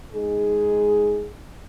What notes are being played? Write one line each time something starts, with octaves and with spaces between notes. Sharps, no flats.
G#3 D#4 G#4